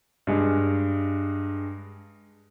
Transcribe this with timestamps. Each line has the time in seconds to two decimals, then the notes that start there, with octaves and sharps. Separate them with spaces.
0.27 G2 G#3